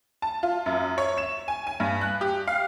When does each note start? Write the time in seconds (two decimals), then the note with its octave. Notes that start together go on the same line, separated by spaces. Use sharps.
0.22 A5
0.43 F4
0.66 F#2
0.98 C#5
1.18 E7
1.48 G#5
1.67 G#5
1.80 G2
2.01 F#6
2.21 G4
2.47 F5